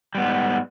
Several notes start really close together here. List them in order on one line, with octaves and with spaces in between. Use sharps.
G3 B3 G#2